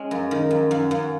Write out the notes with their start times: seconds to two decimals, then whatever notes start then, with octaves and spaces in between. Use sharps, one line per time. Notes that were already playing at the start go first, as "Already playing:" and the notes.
Already playing: G#3 C#4
0.11 F#2
0.31 D#3
0.51 F#2
0.71 F#2
0.91 F#2